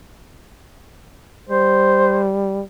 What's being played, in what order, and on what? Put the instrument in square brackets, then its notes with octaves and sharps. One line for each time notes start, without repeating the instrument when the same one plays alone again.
[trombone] G3 [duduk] C5